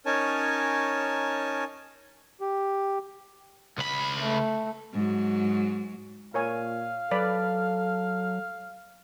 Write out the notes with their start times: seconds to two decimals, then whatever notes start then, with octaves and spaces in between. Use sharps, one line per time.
0.06 C#4 D#4 A#4 C#5 G#5 A5
2.41 G4
3.78 C#2 B5
4.19 A3
4.93 G#2 F#3
6.34 A#2 A#4 C#5 F5 G#5
7.11 F#3 A4 B4 D5 B5